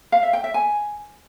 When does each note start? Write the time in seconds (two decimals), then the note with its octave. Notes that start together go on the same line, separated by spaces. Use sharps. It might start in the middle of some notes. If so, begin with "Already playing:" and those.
0.12 F5
0.23 E5
0.33 G5
0.44 E5
0.54 G#5